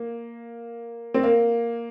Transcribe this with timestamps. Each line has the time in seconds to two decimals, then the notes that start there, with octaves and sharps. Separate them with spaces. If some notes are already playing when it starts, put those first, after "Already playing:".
Already playing: A#3
1.14 C4
1.23 A#3